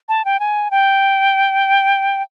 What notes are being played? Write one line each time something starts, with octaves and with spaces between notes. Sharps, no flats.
A5
G5
G#5
G5